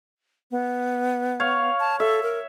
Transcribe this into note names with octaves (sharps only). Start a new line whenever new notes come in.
B3
C#5 F5
A5
A4 E5
A#4